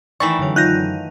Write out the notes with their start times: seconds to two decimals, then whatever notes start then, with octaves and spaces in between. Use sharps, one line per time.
0.20 D#3 E3 A3 D5 B5 C#6 E7
0.38 F#2 D3 F#3
0.56 D#4 F4 F#6 G6 A#6